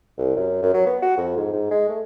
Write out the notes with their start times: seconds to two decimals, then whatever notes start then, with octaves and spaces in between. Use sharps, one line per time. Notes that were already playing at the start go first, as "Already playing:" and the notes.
0.18 C2
0.37 F#2
0.63 F#2
0.74 F#3
0.86 B3
1.02 F#4
1.17 F2
1.37 G#2
1.54 G#2
1.71 G#3
1.89 A3